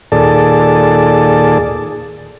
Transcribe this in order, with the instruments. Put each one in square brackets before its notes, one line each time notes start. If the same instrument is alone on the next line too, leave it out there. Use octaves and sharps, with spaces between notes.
[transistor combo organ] D#2 A#2 G#4 A4 D5 A5